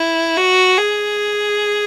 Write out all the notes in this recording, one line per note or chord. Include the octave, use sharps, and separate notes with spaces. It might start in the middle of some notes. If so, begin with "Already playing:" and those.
Already playing: E4
F#4
G#4